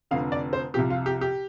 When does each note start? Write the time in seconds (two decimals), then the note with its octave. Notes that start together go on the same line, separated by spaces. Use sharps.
0.11 F1 F2 D3 F5
0.32 D5
0.53 C5
0.74 C2 C3 F3 G4
0.90 F4
1.06 G4
1.21 G4